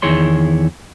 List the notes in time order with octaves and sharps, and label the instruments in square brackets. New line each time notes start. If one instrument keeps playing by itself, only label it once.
[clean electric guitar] E2 D#3 E4 G#4 C#5 C6